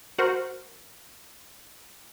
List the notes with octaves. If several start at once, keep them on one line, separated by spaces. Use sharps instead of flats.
F#4 A#4 C5